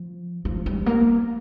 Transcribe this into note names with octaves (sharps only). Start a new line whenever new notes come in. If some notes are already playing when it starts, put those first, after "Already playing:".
Already playing: F3
F3
G3
A#3